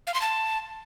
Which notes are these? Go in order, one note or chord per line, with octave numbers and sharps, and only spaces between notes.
F5
C6
A5